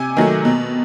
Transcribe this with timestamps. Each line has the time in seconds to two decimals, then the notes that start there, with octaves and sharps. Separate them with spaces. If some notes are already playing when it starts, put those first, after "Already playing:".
Already playing: C3 G#5
0.17 D#3 F#3 A3
0.45 B2